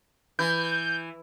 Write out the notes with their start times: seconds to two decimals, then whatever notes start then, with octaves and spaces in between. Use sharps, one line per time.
0.39 E3 G6